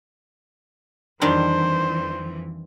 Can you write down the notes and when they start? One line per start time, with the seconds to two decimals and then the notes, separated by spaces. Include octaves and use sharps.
1.22 F2 D#3 E3 G3 D4 C5